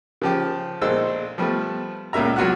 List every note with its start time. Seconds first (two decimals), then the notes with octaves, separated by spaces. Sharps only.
0.22 C#3 F3 G4
0.81 A#1 G#3 D#4 A4 C5 E6
1.38 F3 G3 A3 B3
2.13 C#2 A#2 C#3 E5 A#5
2.36 C2 F#3 F4 F#4 F#5 F#6